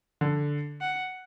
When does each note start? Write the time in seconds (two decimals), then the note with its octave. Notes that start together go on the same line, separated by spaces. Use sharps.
0.21 D3
0.81 F#5